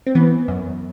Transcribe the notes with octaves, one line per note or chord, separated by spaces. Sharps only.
C4
E3 B3
F#2